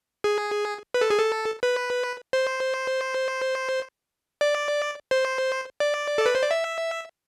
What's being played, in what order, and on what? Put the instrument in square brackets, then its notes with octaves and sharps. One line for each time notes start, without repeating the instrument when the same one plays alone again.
[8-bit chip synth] G#4
B4
A4
G#4
A4
B4
C5
D5
C5
D5
A4
B4
C5
D5
E5